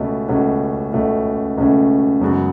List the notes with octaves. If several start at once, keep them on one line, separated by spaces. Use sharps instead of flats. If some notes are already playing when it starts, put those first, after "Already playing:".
Already playing: C#2 B2 A3 C#4
C#2 B2 A3 C#4
C#2 B2 A3 C#4
C#2 B2 A3 C#4
F#2 C#3 G#3 B3 F#4